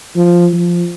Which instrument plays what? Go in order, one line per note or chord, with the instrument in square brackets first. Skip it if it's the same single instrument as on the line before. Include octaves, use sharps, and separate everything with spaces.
[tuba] F3
F3